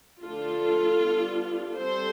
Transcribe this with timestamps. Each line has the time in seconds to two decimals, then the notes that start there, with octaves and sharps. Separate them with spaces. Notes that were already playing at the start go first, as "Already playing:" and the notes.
0.22 D3 F3 A3 D4 F4 A4
1.00 G3 B3 D4
1.78 G3 C4 A4 C5